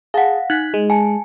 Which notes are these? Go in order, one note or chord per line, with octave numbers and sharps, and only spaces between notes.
G#4 F5 F#5 A5
D#4 F#6 G#6 B6
G#3
G#5 A5